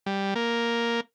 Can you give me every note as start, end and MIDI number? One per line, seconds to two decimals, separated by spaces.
0.06 0.34 55
0.36 1.00 58